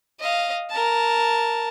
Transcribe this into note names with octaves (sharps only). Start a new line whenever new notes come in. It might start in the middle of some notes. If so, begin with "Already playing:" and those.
D#5 F5
A#4 A5